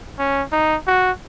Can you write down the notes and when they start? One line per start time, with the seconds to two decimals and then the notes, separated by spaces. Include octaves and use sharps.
0.19 C#4
0.52 D#4
0.87 F#4